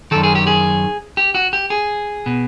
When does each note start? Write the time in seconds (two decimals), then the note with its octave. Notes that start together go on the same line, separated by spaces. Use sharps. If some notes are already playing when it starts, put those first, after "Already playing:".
0.11 F#2 D#3 A4
0.23 G#4
0.35 G4
0.47 G#4
1.17 G4
1.35 F#4
1.53 G4
1.70 G#4
2.26 B2